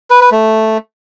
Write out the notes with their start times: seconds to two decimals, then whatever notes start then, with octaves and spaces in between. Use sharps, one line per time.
0.10 B4
0.21 B4
0.32 A3